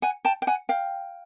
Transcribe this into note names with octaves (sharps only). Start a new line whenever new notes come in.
F#5 G#5
G5 A5
G5
F#5 G#5
F5 G5